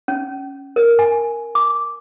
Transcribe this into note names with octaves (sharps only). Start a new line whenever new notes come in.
C#4
A#4
G#5
D6